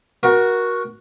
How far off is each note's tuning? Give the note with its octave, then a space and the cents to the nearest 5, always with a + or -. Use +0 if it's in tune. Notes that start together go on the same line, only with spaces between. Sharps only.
F#4 +0 A#4 +25